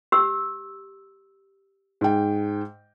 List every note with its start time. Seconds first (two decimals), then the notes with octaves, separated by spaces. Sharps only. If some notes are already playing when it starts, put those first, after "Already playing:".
0.12 G4 E6
2.01 G#2 G5